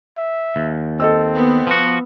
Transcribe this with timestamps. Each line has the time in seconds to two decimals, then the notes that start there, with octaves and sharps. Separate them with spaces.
0.18 E5
0.56 D#2
1.00 C4 A4 D#5 E6
1.34 B3
1.67 F3 F#4